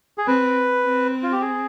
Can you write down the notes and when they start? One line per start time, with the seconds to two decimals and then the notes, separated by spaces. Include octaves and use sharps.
0.18 G#4
0.27 C4 B4
0.84 C4
1.23 F4
1.32 G4
1.41 G#4